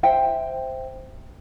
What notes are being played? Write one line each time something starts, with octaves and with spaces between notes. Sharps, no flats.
C5 E5 G5